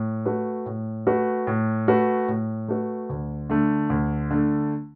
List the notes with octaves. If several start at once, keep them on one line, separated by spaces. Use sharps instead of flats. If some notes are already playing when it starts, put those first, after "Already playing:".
Already playing: A2
A3 F#4 B4
A2
A3 F#4 B4
A2
A3 F#4 B4
A2
A3 F#4 B4
D2
D3 A3
D2
D3 A3